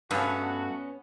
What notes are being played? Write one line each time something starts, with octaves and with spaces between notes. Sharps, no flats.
G2 A3 B3 C#4 F#4